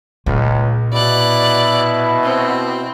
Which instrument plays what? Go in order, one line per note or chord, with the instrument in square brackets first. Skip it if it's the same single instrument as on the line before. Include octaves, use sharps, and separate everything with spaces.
[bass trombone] C#2 [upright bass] A#2
[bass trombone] B2 [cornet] E4 [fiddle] D5 F#6
[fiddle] C4